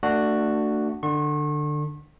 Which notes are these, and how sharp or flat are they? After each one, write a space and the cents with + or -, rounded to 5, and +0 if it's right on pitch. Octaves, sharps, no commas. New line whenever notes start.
A3 +25 D4 +10 F#4 +0
D3 +20 C#6 -40